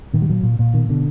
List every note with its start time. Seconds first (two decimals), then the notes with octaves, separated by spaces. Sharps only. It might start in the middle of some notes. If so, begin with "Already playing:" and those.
0.14 A#2 D#3
0.22 G3
0.29 A#2 F#3
0.43 A#2
0.59 A#2
0.74 B2 D#3
0.89 B2 D3